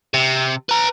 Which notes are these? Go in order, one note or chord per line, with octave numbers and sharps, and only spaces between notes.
C3
B4 A#5